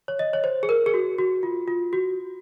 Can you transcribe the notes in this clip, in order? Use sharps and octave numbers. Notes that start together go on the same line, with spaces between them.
C#5
D#5
C#5
C5
G#4
A#4
G#4
F#4
F#4
F4
F4
F#4